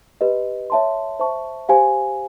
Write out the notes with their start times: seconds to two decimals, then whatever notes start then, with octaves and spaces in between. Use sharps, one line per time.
0.21 G4 B4 D#5
0.70 C#5 E5 A5 C6
1.19 C5 E5 A5 C#6
1.69 G4 C5 F5 G#5